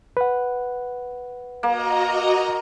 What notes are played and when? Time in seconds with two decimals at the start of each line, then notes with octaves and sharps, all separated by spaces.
0.17 B4 F#5
1.63 A#3 F#4 D#5 A#5